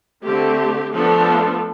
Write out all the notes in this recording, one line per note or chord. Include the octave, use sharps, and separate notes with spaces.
D3 A3 C4 G4
F3 A3 B3 D4 F4 A4